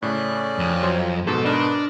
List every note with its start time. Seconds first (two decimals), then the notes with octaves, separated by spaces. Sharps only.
0.02 A2 C#3 A3 C#4 D5 F#6
0.59 F2
0.83 F#3 F4 C5
1.27 G#2 B2 A4
1.45 D4 A#4 B4 D#5